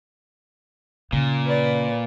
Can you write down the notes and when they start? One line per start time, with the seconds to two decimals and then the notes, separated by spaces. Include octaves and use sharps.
1.12 A#2 C#3
1.45 B4 D5